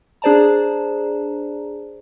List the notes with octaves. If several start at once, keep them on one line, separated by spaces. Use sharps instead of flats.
D4 G#4 C5 D5 A5 A#5